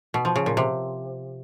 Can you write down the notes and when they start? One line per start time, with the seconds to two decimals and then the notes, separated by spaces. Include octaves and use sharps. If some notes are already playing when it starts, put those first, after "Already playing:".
0.14 B2
0.25 F3
0.36 C#3
0.46 A#2
0.57 C3